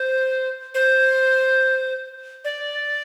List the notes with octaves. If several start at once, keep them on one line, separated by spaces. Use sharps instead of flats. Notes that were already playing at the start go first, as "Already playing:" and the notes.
Already playing: C5
C5
D5